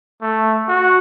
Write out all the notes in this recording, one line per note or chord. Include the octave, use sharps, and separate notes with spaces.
A3
F#4